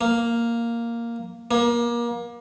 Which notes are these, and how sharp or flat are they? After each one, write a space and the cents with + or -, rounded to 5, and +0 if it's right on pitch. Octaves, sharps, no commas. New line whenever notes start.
A#3 +0
A#3 +30